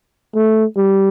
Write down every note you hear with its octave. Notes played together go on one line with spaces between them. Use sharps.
A3
G3